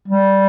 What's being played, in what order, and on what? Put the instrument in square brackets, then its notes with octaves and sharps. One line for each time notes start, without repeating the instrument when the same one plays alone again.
[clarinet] G3